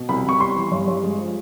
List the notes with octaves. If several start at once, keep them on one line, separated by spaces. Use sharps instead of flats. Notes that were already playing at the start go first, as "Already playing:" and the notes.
Already playing: B2
C2 B5
C2 C#6
G3 C6
E3
G2
G2
G#3
F3